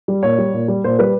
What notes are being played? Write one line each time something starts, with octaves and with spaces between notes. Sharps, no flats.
G3
A#2 C#5
G3
A#2
G3
A#2 C5
G3 B4